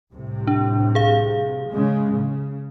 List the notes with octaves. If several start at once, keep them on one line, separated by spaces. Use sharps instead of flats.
C2 A2 C3
D4
G#4 F5
C#3 G#3
C#3